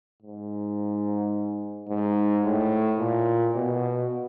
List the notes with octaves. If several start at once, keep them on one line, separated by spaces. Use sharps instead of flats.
G#2
G#2
A2
A#2
B2